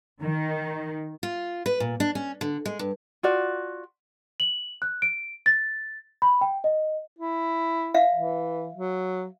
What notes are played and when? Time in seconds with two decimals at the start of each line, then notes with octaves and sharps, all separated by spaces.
0.22 D#3
1.23 F4
1.66 B4
1.80 A#2
2.00 D4
2.15 C#4
2.41 D3
2.66 G#3
2.79 G2
3.23 F4 F#4 D5
4.40 F#7
4.82 F#6
5.02 D7
5.46 A6
6.22 B5
6.41 G5
6.64 D#5
7.19 E4
7.94 E5 F5
8.14 E3
8.75 F#3